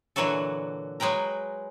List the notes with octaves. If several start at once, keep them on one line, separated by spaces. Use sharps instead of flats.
A#2 D3 E3 F#3 F#4 A4
F#3 G#3 B4 G5 A#5